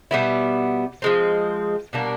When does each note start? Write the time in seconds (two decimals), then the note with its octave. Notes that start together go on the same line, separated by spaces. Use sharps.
0.11 B2 G3 B3 E4
1.02 F3 G#3 C4
1.93 B2 G3 A#3 D4